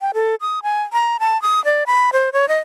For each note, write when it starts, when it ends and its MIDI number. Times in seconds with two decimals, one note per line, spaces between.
0.01 0.11 79
0.14 0.35 69
0.41 0.60 87
0.63 0.82 80
0.93 1.17 82
1.20 1.40 81
1.42 1.63 87
1.65 1.84 74
1.87 2.10 83
2.13 2.30 72
2.33 2.48 73
2.48 2.58 75